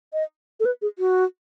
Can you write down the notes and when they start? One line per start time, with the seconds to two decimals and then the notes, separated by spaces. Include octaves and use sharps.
0.13 D#5
0.60 A4
0.65 B4
0.82 G#4
0.99 F#4